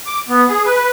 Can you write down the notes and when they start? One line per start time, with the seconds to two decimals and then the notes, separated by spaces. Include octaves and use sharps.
0.06 D6
0.29 B3
0.49 G#4
0.65 B4